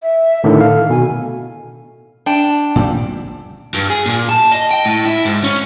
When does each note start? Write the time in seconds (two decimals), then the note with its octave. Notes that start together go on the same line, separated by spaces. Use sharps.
0.03 E5
0.44 A2 D3 D#3 A4
0.61 F5
0.90 B2 G#5
2.26 D4 G5
2.76 A#2 G3
3.74 G2
3.90 G#4
4.06 A#2
4.29 A5
4.52 D#5
4.71 G5
4.85 A2
5.05 E4
5.25 G#2
5.44 C#4